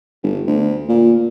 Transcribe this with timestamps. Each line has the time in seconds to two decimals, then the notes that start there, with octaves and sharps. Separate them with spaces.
0.23 G1
0.47 D2
0.89 A#2